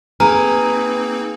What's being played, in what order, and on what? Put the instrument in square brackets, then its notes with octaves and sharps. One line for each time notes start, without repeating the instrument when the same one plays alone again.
[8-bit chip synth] A#3 C4 D#4 [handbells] G#4 G#5 F6 [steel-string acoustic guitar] B4 [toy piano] A#5